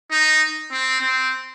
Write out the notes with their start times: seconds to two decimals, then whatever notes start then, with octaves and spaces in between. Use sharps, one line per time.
0.11 D#4
0.71 C4
1.01 C4